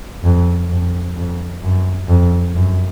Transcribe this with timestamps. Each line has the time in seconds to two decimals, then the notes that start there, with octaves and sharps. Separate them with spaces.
0.24 F2
0.70 F2
1.17 F2
1.62 F#2
2.09 F2
2.55 F#2